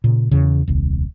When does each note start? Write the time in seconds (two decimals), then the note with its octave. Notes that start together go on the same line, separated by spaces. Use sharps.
0.04 A#2 C#3
0.31 E2 C#3
0.68 D#1 C2